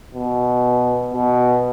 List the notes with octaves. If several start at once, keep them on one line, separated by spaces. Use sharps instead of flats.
B2
B2